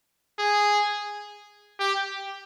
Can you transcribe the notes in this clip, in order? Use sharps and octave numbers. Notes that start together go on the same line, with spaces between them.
G#4
G4